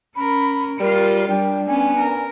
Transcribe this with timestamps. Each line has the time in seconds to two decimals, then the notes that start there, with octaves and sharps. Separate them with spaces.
0.16 C#4 A#4 B5
0.80 G3 F4 A#4
1.29 G3 D4 G5
1.67 B3 C#4 G#5
1.99 A#4